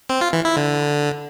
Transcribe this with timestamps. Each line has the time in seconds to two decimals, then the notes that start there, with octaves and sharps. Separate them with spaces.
0.09 C4
0.21 F4
0.33 E3
0.45 E4
0.57 D3